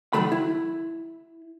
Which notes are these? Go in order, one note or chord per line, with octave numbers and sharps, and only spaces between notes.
C#2 G2 D#3 F#3 A3 B5
E4